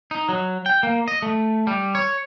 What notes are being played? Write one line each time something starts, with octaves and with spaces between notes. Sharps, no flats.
D#4
F#3
G5
A#3
D#5
A3
G3
C#5